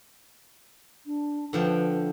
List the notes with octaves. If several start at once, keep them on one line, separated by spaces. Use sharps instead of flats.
D4
D3 F3 B4 G5